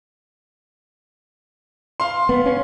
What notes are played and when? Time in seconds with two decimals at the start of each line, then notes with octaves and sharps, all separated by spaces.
2.00 F5 C6
2.29 B3
2.46 C#4